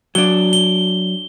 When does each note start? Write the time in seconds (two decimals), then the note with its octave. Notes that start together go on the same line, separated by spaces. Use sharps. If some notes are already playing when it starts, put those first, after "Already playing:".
0.15 F#3 D4 G7
0.53 G7